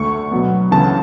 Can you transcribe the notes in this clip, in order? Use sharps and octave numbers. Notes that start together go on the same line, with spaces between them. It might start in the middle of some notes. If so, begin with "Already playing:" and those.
Already playing: D2 D3 A3 C#6
B2 F#3 B3
D2 C#3 E3 B3 A5